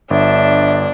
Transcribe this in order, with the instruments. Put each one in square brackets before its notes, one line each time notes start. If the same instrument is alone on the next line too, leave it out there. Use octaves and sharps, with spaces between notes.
[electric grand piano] G1 [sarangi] D4 [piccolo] E5